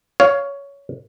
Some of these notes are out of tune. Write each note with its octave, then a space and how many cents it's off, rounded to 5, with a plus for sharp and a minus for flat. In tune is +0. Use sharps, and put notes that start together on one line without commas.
C#5 +15 F5 +0